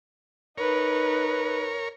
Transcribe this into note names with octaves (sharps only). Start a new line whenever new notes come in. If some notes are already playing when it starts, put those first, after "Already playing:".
D#4 A#4 B4 C#5